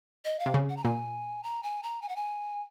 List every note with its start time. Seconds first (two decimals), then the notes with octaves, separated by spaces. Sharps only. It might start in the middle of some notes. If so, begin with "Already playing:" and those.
0.25 D#5
0.39 F5
0.46 C3
0.54 C#3
0.69 F#5
0.77 A#5
0.84 A#2 G#5
1.43 A#5
1.63 G#5
1.83 A#5
2.02 G#5
2.09 F#5
2.16 G#5